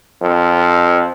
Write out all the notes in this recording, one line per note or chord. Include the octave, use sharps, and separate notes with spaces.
F2